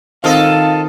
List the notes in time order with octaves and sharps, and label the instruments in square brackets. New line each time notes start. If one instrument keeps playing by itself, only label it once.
[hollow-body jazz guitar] D#3 C4 [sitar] F4 A4 D#5 [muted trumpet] F5